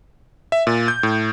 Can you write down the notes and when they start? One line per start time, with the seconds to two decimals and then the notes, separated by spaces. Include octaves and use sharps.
0.52 E5
0.67 A#2
0.88 G6
1.03 A2